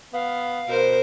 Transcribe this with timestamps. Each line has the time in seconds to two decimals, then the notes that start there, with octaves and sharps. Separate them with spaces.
0.13 B3 F5
0.68 B2 A#4 C5